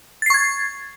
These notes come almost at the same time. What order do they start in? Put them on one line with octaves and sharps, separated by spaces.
A6 C7 C#6 G#6